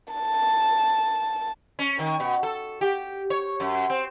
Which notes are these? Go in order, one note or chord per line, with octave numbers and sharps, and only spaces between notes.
A5
C#4
D#3
B2
A4
G4
C#5
F#2
C4